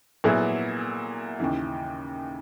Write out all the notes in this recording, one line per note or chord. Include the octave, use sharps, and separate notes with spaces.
A#2 F#3 B3 E4 G#4
D#2 C#3 E3